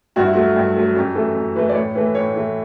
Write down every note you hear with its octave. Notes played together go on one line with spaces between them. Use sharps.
G2 F#4
E4
F#3 A3 F#4
G2
F#3 A3
F#2 G4
E3 A3 A4
F#2
E3 A3 B4
D5
A2 C#5
E3 A3 B4
A2 C#5
E3 A3